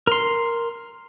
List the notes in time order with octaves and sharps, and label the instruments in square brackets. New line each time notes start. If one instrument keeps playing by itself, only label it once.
[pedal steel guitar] A#4 C6